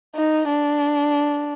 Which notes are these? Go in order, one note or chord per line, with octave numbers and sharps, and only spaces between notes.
D#4
D4